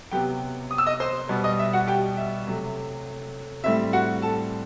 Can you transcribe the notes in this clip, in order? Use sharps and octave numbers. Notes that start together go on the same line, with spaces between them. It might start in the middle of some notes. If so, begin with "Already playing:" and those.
C3 F#3 B3 G4 G5
D#6
E6
D#5 D#6
C5 C6
B2 G3 B3
D#5 D#6
E5
F#4 F#5
G4 G5
E5
C3 F#3 A3
A2 G3 C4 E5
F#4 F#5
A4 A5